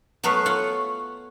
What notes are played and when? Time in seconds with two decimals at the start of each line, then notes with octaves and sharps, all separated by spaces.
0.23 F#3 A3 B3 B4 F5
0.46 F4 C#5 F#5